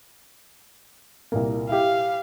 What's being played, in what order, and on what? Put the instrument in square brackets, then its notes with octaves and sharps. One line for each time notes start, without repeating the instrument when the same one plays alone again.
[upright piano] C2 A#2 A#3
[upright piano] E4 G4 [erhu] F5